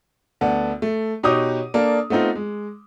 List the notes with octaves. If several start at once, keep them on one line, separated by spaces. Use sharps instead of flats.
D2 B3 A4 D5
A3
B2 D#4 G4 C#5 D6 D#6
A#3 D4 A4
A3 B3 C4 D#4 F4
G#3